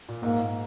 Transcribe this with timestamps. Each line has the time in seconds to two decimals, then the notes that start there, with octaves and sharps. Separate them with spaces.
0.09 A#2
0.23 G#2 A#3
0.39 G#2